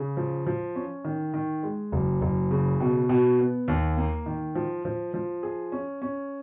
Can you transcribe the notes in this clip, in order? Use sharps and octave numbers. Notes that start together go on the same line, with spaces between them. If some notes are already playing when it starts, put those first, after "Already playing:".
Already playing: C#3
F3
F3
C#4
D#3
D#3
G#3
F#1
F#1
C#3
B2
B2
B3
D#2
A#3
D#3
F3
F3
F3
G#4
C#4
C#4